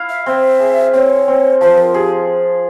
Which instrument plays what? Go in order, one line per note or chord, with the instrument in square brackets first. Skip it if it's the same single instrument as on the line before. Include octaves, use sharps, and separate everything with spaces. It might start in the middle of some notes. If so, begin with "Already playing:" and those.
Already playing: [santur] E4 F5
[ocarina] E5
[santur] C4 [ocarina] E5
[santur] G#4
[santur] C4 [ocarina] C#5
[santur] C4
[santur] F3 [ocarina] C5
[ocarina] A#4
[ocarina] G4 [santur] G#4